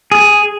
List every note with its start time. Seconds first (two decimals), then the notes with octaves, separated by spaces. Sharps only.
0.12 G#4